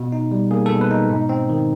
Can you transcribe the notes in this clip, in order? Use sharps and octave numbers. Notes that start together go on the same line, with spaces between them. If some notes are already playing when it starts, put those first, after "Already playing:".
Already playing: B2
D#4
G3
A#3 G#4
B2 A4
B4
D#4
G#2
C4
D#3